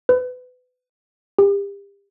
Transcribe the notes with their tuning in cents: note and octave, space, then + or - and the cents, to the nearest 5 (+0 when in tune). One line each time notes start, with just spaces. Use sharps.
B4 +25
G4 +35